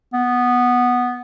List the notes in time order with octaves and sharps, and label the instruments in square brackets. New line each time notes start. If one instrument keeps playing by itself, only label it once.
[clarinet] B3